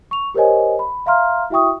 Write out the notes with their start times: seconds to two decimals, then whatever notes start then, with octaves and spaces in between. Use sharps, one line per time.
0.11 C#6 F7
0.34 G4 A#4 C5 C#5 D#5 G#5
0.79 B5
1.06 E5 F5 A#5 C6 F6
1.50 E4 F#4 E5 G5 C#6 D#6